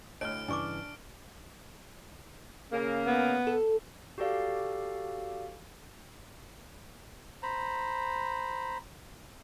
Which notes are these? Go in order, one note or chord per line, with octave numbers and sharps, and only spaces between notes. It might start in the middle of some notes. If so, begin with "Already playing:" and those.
D2 A2 C#5 D#5 F6 D7
G2 C#3 E3 D4 G#5 C#6 D6
C#3 A#3
B3
A4
F#4 G4 A4 D5 F5
C5 A#5 B5